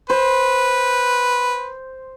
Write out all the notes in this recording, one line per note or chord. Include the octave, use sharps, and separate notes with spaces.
B4 C5